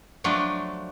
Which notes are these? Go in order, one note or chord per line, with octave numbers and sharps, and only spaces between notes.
F3 F#3 A3 D4